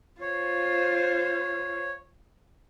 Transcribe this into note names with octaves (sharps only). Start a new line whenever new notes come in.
F4 C5 C#5